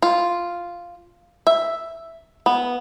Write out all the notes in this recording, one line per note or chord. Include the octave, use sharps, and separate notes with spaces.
F4
E5
B3